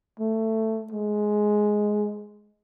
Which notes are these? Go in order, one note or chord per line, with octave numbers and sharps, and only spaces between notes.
A3
G#3